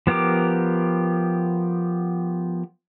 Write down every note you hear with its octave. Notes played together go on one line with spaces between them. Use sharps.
F3 B3 G4 A#4 D6